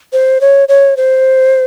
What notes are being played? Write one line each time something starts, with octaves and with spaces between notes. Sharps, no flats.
C5
C#5
C#5
C5